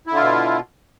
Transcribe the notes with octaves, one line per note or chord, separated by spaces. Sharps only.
B2 D3 E4 F4